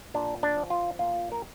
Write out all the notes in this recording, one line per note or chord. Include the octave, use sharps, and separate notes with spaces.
A#2 D4
D4
F3
F4
A#2 F4
A#4